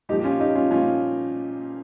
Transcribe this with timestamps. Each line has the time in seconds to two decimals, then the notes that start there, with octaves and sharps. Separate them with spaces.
0.09 A#2 D#4 G4
0.12 F3
0.19 G4
0.24 C#4 F4
0.40 D#4 G4
0.55 C#4 F4
0.71 A#2 F3 C#4 F4